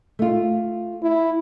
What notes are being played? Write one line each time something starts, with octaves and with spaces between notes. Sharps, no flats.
A3 F4
E4